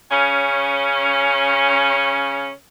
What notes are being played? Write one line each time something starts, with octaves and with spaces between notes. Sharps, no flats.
C#3 C#4